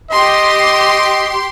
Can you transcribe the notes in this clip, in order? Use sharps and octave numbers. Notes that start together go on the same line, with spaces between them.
G4 D#5 C6